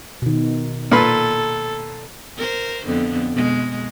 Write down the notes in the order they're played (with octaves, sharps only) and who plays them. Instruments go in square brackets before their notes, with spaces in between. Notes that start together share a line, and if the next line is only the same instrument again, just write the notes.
[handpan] B2 D#3
[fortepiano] A#2 B4 [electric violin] A4
[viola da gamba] A#4 C5
F2 D3 B3
B2 G#3